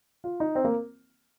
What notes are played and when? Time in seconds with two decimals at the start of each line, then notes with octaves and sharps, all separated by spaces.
0.24 F4
0.40 D#4
0.55 C4
0.64 A#3